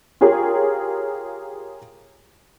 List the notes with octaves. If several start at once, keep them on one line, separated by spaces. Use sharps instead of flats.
F4 G4 G#4 A#4 C#5